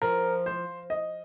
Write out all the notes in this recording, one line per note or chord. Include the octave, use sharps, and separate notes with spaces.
F3 A#4
C5
D#5